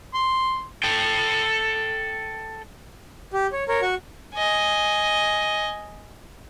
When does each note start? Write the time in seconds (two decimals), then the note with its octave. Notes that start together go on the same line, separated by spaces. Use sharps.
0.14 C6
0.84 A4 G5
3.33 G4
3.52 C#5
3.69 A#4 C#5
3.82 F#4 C#6
4.35 D#5 G#5